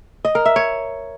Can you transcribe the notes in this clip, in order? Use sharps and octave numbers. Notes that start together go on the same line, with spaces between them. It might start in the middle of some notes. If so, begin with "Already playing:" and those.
D#5
A#4
E5
C#5